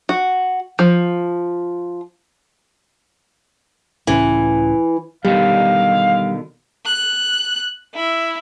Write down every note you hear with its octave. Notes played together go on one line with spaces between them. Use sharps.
F#4
F3
C#2 A2 E3 C#4
B2 D3 D#3 G3 F5
F#6
E4